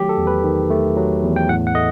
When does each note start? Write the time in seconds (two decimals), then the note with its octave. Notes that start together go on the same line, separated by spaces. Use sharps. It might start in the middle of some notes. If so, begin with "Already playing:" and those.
Already playing: D#3 F#3 A3 G4
0.09 A4
0.18 E2
0.27 B4
0.44 D#3
0.70 A3
0.97 F#3
1.23 E2
1.36 G5
1.49 A2 F#5
1.67 F#5
1.75 A3 D#5